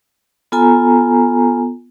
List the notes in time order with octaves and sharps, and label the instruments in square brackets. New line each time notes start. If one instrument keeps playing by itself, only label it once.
[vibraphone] B3 F4 A4 G#5 A#5